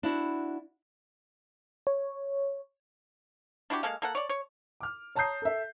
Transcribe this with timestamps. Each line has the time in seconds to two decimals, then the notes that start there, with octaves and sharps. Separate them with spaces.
0.03 D4 E4 F#4
1.87 C#5
3.70 D4 E4 F#4 G4
3.83 G#3 A#3 A4 F5
4.02 A#3 A4 F#5
4.15 C#5 D5
4.29 C#5
4.80 D6 F6
5.15 C#5 A5 A#5 D#6 G6 C7
5.42 A4 E5